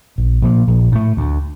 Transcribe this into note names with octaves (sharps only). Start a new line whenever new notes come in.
A#1
A#2 F3 A#3
A#1
A2 A3
D2